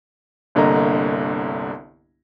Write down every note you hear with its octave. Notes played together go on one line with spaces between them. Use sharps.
G1 C2 D3 A#3 D#5 A#5